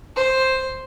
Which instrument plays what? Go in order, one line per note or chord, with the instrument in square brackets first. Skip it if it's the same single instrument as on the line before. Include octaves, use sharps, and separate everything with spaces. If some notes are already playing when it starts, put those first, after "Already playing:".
[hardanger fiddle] C5